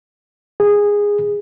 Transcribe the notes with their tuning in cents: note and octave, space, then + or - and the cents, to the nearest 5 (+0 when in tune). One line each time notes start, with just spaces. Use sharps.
G#4 -15